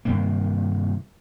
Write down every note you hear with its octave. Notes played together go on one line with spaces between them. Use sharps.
G2 C3 D#3 A#3